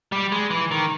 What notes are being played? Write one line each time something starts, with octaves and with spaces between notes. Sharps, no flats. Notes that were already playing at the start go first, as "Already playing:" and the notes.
G3
G#3
E3
D#3